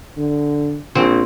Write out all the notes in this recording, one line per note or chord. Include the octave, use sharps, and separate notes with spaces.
D3
A#1 C4